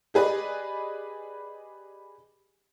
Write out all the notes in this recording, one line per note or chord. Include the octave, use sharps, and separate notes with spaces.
G4 G#4 B4 D5 D#5